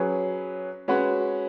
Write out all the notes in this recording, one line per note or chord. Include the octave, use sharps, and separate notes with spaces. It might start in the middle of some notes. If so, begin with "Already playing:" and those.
Already playing: F#3 C#4 G#4 B4
G#3 C#4 F#4 B4